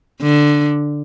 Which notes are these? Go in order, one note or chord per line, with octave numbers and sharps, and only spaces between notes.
D3